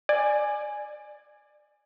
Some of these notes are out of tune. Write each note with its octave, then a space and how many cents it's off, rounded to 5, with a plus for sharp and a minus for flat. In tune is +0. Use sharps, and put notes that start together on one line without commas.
D5 +25 G#5 +0